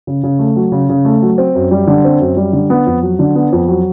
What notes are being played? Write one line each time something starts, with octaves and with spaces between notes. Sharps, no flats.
C#3
C#3
A3
F#3
C#3
C#3
A3
F#3
C4
F#2
G3
D3
C4
F#2
G3
D3
B3
F2
F#3
D3
B3
F2
F#3